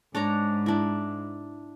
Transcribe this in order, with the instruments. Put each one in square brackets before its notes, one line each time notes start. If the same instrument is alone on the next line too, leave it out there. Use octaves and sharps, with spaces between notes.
[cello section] G#2 [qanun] D4 C#5 A#5
[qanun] D4 E4